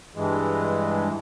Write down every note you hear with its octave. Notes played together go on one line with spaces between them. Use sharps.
G2 E3 G#3